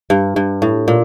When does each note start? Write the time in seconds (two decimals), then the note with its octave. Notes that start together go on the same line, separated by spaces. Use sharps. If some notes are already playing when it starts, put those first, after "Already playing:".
0.10 G2
0.36 G2
0.62 A2
0.88 A#2